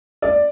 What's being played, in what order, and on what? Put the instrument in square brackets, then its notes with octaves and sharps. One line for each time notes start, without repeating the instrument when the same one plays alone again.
[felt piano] D5